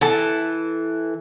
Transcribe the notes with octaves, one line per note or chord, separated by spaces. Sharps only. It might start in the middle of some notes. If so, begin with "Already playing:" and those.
E3 A4 A5